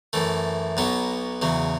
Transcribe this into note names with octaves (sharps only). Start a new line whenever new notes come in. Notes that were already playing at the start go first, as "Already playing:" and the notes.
F#2 E3 A3
B1 B2 F#3 B3
E2 C#3 F#3